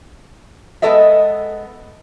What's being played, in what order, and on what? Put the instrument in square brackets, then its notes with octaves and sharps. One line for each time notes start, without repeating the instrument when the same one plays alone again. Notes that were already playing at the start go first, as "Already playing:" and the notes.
[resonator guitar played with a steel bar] G#3 B3 A4 B4 D#5 E5